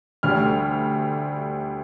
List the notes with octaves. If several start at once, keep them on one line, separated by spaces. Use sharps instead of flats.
D2 D3 G3 F6